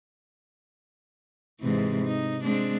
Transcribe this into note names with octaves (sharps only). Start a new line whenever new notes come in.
G#2 C3 E3
D#4
G#3 C4 D4